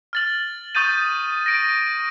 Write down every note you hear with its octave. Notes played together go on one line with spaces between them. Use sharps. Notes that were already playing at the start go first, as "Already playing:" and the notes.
F6 A6 F#7
C#6 D#6 G6 A6 D#7
A#6 D7